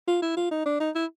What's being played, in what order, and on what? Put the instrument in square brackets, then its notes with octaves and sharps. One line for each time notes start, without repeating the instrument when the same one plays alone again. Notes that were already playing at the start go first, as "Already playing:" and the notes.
[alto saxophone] F4
E4
F4
D#4
D4
D#4
E4